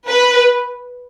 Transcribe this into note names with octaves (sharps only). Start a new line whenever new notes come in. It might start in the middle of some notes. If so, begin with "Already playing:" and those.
B4